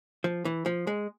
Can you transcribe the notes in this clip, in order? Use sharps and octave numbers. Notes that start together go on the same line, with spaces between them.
F3
E3
F3
G#3